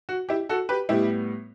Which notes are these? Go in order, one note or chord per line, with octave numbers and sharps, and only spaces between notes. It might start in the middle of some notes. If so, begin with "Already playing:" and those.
F#4
E4 G4
F#4 A4
G4 B4
A2 G3 B3 E4 G4